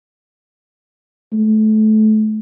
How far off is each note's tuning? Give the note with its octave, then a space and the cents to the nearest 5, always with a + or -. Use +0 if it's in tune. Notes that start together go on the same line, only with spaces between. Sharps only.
A3 -25